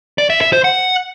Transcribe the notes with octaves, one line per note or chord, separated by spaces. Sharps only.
D5
E5
E5
C5
F#5